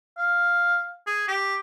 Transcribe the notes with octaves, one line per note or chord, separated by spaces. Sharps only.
F5
G#4
G4